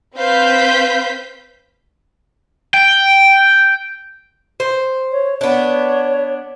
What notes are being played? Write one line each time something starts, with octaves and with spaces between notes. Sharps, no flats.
C4 B4 C5 F5 G6 B6
G5
C5
C#5
B3 D4 C#5